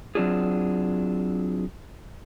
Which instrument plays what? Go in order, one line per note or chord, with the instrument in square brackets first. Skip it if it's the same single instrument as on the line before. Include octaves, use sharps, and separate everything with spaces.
[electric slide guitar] F#3 C4 D4 F4 G#4